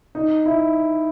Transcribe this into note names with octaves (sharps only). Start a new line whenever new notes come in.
D#4
E4